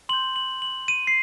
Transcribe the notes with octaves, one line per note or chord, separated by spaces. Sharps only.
C6 G6 F#7
F#7
F#7
D#7
C7